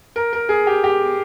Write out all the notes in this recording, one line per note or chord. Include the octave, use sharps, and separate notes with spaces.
A#4
A#4
G#4
G4
G4